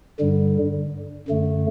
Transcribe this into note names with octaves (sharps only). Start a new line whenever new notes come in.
G2 D3 G3
F#2 D3 A3